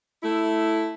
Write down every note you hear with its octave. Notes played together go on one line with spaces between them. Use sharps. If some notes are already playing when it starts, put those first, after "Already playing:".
A3 E4